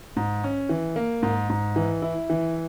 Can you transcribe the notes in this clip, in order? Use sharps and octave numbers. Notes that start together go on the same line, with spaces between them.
G#2
C#4
E3
A#3
G#2
G#2
E3
E4
E3